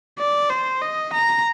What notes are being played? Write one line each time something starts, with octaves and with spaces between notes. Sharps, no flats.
D5
C5
D#5
A#5